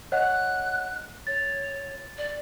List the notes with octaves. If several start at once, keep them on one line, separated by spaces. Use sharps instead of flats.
C#5 D#5 F#5 F#6
C#5 A6
D5